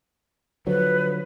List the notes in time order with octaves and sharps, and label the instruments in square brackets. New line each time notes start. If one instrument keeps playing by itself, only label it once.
[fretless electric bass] D3 F3 F#3 [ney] B4